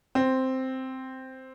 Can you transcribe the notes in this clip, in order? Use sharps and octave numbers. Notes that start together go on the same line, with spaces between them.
C4